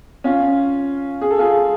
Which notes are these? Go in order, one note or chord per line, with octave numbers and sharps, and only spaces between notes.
C#4 F4
G#4
A4
F4 G#4